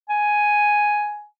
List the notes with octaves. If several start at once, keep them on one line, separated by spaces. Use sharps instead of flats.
G#5